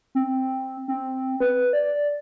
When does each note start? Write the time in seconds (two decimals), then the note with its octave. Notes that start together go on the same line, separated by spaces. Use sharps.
0.15 C4
0.88 C4
1.40 B4
1.73 D5